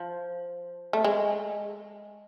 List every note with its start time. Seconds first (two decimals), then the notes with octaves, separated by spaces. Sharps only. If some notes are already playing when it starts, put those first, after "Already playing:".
Already playing: F3
0.93 A3
1.04 G#3